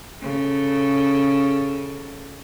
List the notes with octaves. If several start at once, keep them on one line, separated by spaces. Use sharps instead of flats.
C#3 A4